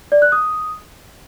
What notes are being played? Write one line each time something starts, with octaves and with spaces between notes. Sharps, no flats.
D5
F#6
D#6